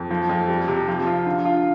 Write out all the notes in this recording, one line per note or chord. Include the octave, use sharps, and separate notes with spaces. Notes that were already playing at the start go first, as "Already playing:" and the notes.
Already playing: F2
F3
F2
G3
C3
F3
F4
D3
F4